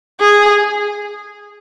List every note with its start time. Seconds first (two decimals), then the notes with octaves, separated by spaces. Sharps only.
0.20 G#4